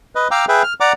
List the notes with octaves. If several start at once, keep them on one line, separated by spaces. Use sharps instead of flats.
B4 D#5
F5 G5 A#5 D6 E6
G#4 B4 E5 G5
F6
D5 F#5 A#5 D6